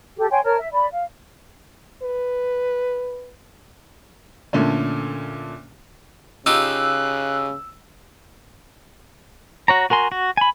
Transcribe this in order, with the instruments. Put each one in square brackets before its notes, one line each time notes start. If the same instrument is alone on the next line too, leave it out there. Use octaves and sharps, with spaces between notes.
[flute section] G4 A4
C#5 G5 G#5 C6
A#4 C#5 A5 F6
E5
D5 B5
F5
[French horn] B4
[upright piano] A#2 D3 A3 C#4
[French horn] C#3 [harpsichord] D#4 F4 G4 [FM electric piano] E6 [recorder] F#6
[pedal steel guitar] F#4 C#5 A#5
F#4 A#4 G#5 C6
F#4
G#5 B5